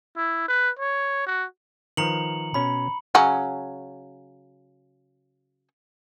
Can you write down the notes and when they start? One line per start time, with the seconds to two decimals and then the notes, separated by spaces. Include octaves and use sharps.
0.16 E4
0.48 B4
0.79 C#5
1.27 F#4
1.97 D#3 F3 B4 A#5 C#7 F#7
2.54 B2 C#4 B5
3.15 C#3 F#3 C#4